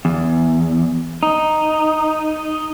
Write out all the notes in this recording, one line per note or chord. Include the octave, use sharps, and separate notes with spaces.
E2
D#4